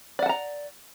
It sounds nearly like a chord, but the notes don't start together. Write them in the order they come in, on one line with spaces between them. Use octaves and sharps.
D5 F#5 A5 A#5